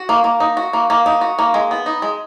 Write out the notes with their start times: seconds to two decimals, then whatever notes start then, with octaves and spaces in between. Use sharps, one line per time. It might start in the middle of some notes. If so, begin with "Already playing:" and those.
Already playing: F#4
0.09 A#3
0.24 A#3
0.40 D#4
0.57 F#4
0.73 A#3
0.90 A#3
1.06 D#4
1.21 F#4
1.39 A#3
1.54 G#3
1.71 B3
1.86 D#4
2.02 G#3